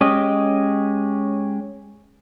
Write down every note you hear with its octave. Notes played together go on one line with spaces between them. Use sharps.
G#3 C#4 G4 D#5